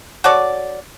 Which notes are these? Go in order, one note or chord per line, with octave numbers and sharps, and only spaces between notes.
F#4 A4 C#5 D5